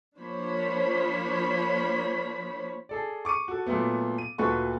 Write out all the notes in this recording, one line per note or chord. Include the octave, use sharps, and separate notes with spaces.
F3 A#3 D4 C5 C#5 B5
G#4 A4 D5
C#6 D6 C#7 D#7
F#4 A4
A#2 F#3 A3 B3
D#7
D2 A#2 F#4 A4 B4 C#6